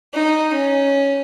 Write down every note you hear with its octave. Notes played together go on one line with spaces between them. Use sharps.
D#4
C#4